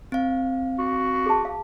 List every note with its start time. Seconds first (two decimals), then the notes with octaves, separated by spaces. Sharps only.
0.12 C4 F5
0.79 F#4
1.26 G#4 A5
1.45 F5